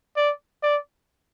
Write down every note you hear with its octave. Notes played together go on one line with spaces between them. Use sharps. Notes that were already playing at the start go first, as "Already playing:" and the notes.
D5
D5